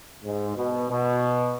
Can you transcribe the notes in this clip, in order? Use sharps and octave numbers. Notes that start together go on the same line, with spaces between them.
G#2
B2
B2